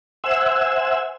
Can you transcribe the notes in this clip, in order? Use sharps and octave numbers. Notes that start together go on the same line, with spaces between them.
C5 E5 F#5 G#5 E6